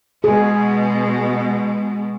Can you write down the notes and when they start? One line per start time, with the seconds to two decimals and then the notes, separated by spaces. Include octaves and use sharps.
0.24 B2 G#3 G#4